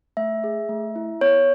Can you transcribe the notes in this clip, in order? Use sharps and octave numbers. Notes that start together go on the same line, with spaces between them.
A3 E5
G#4
A3
E4
B3 C#5